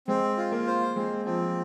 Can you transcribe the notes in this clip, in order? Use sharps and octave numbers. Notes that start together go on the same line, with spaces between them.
G#3 C4
F4
A#3
C5
G#3 C4
F3 C4